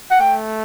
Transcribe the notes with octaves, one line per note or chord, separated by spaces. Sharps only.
F#5
A3 G5